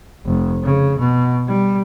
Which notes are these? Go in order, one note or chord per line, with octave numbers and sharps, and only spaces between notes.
F1
C#3
B2
G3